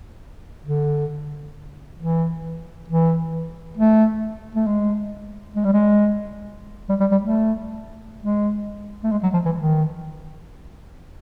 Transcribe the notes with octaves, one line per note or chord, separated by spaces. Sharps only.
D3
E3
E3
A3
A3
G#3
G#3
G3
G#3
G3
G3
G3
A3
G#3
A3
G#3
F#3
F3
E3
D#3